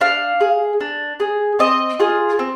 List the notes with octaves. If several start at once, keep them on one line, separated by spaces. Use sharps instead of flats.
D4 F5
G#4
D4
G#4
C4 D#5
F4 G#4
C4